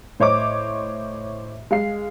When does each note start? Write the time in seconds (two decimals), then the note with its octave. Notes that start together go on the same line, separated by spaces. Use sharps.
0.20 A2 C5 C#5 D#5 D6
1.71 G#3 F5 C7